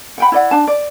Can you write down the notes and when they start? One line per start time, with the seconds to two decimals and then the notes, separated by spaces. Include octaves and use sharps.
0.18 F#5 G5 B5
0.32 E4 D5 F#5
0.51 D4 A5
0.67 D5